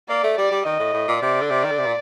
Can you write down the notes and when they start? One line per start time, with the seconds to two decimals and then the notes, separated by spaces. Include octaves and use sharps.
0.09 A#3 D5
0.23 A3
0.38 G3 D5
0.51 G3
0.65 D#3 D#5
0.79 A2
0.94 A2
1.08 A#2
1.22 C3 D5
1.41 D3
1.50 C3
1.64 D#3
1.71 D3
1.78 C3
1.86 A#2